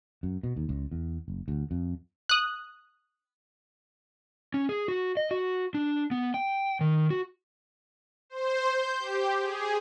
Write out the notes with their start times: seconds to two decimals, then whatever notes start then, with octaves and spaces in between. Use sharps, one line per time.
0.23 F#2
0.43 B2
0.56 D#2
0.69 C#2
0.92 E2
1.28 F#1
1.48 D2
1.71 F2
2.29 D#6 F#6
4.54 C#4
4.69 G#4
4.88 F#4
5.17 D#5
5.31 F#4
5.74 D4
6.11 B3
6.34 G5
6.81 D#3
7.10 F#4
8.30 C5
8.70 G6
8.99 G4
9.41 G#4